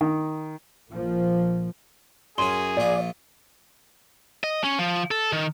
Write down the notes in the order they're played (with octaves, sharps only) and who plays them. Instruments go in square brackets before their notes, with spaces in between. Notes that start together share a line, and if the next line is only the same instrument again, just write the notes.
[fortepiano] D#3
[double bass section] A#1 F3 A#3
[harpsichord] F#2 C#4 [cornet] G#4 [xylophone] C6
[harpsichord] A#1 F4 [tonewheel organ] D5
[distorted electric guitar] D#5
C#4
F3
A4
D#3